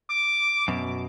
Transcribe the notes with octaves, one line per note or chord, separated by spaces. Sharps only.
D6
F#2 B2